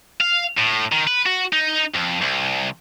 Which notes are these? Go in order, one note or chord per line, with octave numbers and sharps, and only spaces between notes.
F5
A2
D#3
B4
F#4
D#4
F2
C2